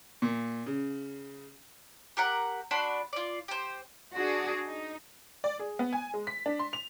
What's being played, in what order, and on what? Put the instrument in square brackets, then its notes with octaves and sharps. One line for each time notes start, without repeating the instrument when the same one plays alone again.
[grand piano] A#2
C#3
[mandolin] G4 A#4 F#5
D4 F#4 B5 C6
F4 D5
G4 C5
[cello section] D4 F#4 G#4
D#4
[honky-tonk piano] D5
G#4
B3
G#5
G#3
B6
D4
C6
F7